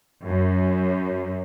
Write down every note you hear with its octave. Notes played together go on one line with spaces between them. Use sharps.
F#2